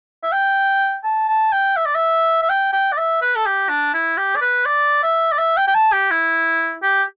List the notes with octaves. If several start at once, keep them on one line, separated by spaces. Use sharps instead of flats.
E5
G5
A5
A5
G5
E5
D5
E5
E5
G5
G5
D5
E5
B4
A4
G4
D4
E4
G4
D5
B4
D5
E5
D5
E5
G5
G5
A5
G4
E4
G4